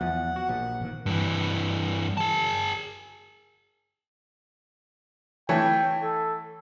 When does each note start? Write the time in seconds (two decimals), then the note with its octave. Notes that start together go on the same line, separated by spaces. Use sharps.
0.01 E2 F3 F#5
0.36 F#4
0.49 A#1 F3
0.81 A#2 D#3 A#3
1.06 G2 E3
2.17 G#4 A5
5.49 E3 A3 C#5 G5
6.03 A4